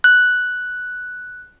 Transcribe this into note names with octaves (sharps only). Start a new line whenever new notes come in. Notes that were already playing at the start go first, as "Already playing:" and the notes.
F#6